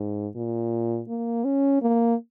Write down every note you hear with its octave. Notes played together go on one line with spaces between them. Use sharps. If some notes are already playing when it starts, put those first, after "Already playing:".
Already playing: G#2
A#2
A#3
C#4
A#3